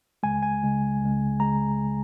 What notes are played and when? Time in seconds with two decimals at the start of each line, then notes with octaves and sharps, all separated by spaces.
0.23 C#2 C#3 G#3 G#5
0.43 G#5
0.62 C#2 C#3 G#3
1.01 C#2 C#3 G#3
1.40 C#3 G#3 A#5